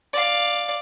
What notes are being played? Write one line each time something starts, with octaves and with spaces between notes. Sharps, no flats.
D5 F5